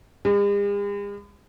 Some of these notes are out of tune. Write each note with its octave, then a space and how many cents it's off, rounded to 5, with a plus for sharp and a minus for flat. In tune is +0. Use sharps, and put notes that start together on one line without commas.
G#3 -45